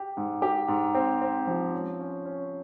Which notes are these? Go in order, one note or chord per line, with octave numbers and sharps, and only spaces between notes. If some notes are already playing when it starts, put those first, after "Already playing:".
Already playing: G4
G#2
G4
G#2
C4
C4
F3
C#4
C#4
C#4